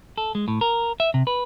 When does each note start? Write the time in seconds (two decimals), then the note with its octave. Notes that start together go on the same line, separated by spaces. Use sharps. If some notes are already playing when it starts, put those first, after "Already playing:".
0.18 A4
0.35 G#3
0.48 A2
0.61 A#4
1.00 E5
1.14 C3
1.27 B4